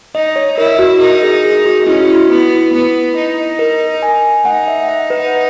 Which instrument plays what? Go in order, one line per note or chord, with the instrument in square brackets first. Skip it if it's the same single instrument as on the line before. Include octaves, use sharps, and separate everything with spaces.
[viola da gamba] D#4 [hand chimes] D#5
[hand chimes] C#5
[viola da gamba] E4 [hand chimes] A#4
[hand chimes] F#4
[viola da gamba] D#4 [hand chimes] A#4
[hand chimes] G#4
G#4
F#4
[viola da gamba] C#4 [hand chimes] E4
[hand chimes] F#4
E4
[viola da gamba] B3 [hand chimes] E4
[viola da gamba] B3
D#4
[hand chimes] A#4
G#5
[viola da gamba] D#4 [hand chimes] F#5
[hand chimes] E5
F#5
B4